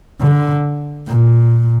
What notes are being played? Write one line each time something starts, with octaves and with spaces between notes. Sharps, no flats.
D3
A#2